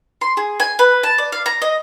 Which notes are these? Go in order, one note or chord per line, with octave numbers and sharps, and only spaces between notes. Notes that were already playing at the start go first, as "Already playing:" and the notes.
C6
G#4
G#5
B4
A5
D5
F5
A#5
D#5